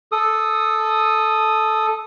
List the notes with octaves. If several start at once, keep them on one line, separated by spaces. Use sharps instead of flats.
A4 D#6